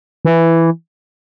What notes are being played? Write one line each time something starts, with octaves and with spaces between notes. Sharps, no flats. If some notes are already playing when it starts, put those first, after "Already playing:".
E3